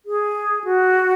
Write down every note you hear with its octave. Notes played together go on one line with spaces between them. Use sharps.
G#4
F#4